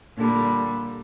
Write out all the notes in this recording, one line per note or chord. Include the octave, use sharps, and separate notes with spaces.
A#2 D3 G3